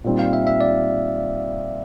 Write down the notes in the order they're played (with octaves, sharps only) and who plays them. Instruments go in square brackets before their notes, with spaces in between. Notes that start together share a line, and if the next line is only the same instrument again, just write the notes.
[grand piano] A#2 G3 C4 D#4
[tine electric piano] F5
E5
E5
D5